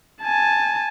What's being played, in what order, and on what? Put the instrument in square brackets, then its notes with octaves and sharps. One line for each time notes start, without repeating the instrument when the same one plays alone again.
[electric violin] G#5 A5